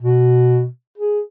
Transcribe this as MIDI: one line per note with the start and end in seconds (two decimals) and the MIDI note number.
0.02 0.66 47
0.98 1.20 68